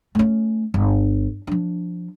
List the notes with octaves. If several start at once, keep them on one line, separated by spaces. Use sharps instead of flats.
A3 C#4
G1
F3 D4